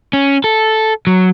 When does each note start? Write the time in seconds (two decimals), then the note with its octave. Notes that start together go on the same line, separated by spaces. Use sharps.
0.13 C#4
0.44 A4
1.07 F#3